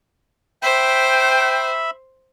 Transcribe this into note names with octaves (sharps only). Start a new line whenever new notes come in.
C5 E5 G5 B5